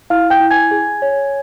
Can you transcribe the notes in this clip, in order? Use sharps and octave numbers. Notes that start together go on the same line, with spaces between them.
E4 F5 F6
G5 G6
E4
G#5 G#6
G#4
C#5